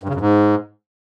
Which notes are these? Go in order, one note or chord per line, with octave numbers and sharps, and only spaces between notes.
G2
C#3
F#2
G#2